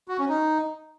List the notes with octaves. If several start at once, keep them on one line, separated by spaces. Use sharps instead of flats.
F#4
C#4
D#4